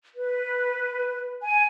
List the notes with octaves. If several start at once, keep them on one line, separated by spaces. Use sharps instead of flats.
B4
G#5